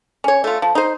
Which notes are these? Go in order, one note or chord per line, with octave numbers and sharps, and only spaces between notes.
C#4 C#5
A3 F4
F3
D#4 C5